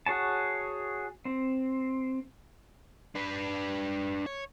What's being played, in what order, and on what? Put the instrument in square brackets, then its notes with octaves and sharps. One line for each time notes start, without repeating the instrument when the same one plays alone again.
[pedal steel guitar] F#4 G#4 C#5 A5
C4
[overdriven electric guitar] D4 B4
C#5